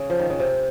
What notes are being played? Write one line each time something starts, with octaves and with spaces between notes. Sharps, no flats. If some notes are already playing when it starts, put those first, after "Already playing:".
Already playing: C#3
F3
D#3
C#3
C3